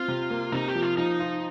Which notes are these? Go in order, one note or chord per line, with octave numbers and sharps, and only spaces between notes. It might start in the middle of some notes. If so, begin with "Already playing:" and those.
Already playing: C4 F4
C3
A#3
C3 D#4
G4
F3
F4
F3 D#4
F4